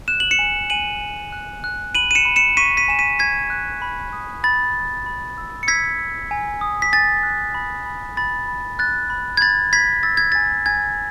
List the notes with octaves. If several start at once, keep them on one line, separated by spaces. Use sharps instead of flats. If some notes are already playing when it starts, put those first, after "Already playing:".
F#6 E7
F#7
C#7 E7
G#5
G#5 D#7 F#7
G#5
F#6
F#6
B5 D#7 F#7
D#7
C#7 E7
B5
C#7 E7
C#6 B6 D#7
B6 D#7
G#5 E7
B6 D#7
G#5 G#6 B6
F#6
B5
D#6
B5 A6
B5
B5
E6
C#7
E6 G#6 B6
E6
G#5
D#6
B6
G#5 A6
F#6
B5
B5
B5 A6
B5
F#6 A6
B5
G#6
B5 A6
B5 G#6 B6
E6 A6
G#6
G#5 A6
G#5 G#6